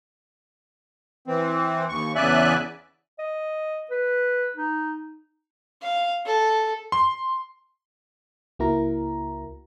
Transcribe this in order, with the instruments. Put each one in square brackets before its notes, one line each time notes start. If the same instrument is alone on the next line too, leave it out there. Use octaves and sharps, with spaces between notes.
[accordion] E3 C4
D#2 C#6
E2 C#3 D5 E5 G#5 F#6
[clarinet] D#5
B4
D#4
[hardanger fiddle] F5
A4
[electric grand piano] C6
[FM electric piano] C#2 A#3 E4 F#4 A#4 A#5